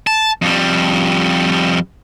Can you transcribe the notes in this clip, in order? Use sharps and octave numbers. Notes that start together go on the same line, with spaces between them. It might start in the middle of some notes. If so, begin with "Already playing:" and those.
A5
F2 G3